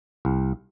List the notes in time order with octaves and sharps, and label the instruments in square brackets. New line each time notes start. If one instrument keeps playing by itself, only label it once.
[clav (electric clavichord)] C2